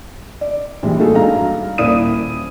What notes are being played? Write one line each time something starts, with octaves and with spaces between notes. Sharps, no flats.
D5
A#1 E3 G3 G#3 D4
A3 A#3 D#4 F#4 G#4 A4
G2 F#4 F5 A#5
D#1 A#3 E4 D5 D#6 D#7